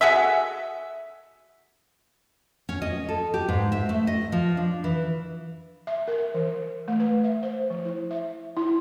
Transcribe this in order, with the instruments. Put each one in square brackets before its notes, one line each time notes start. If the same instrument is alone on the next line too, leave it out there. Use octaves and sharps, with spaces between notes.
[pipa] F#4 G#4 A4 E5
[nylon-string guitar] C#4
D#5
A4
G4
G#2
E5
A3
D#5
F3
D4
E3
[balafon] E5
A#4
E3
A3
B4
E5
C5
F3
E4
E5
E4